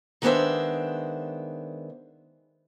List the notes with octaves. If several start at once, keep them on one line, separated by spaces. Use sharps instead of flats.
D#3 G#3 B3 D4 C5 E5